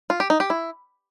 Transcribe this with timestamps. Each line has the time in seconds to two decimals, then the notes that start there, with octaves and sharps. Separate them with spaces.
0.10 F4
0.20 G4
0.30 D#4
0.40 G4
0.50 E4